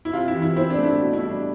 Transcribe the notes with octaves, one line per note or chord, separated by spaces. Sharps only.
E4
C3 F4
E4
E3
E4
C4 E4
D4
A3
E4
B2
E4
G3
D4